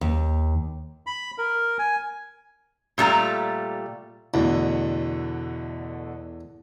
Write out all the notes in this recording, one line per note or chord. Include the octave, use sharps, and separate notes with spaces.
D#2
B5
A#4
G#5
A#2 G3 A3 A#5
E2 B2 D3 A3